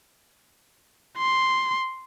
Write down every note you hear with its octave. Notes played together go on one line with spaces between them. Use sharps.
C6